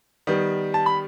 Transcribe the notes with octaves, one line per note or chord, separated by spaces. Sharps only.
D#3 G3 B3
A5
B5